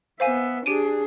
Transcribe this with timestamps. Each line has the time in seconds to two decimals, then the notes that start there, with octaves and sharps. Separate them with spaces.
0.20 B3 C5 E5 F5 G#5
0.66 D4 G4 G#4 D7 D#7